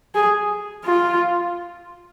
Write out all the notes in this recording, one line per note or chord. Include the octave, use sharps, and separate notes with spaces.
G#4
F4